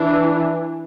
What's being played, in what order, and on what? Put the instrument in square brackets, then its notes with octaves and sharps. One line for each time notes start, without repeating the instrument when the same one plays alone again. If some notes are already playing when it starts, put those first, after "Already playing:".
Already playing: [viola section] E3 [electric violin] D4